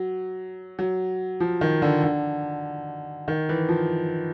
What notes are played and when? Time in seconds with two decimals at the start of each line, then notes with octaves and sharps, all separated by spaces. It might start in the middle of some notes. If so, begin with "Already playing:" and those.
Already playing: F#3
0.79 F#3
1.40 F3
1.61 D#3
1.82 D3
2.03 D3
3.28 D#3
3.49 E3
3.69 F3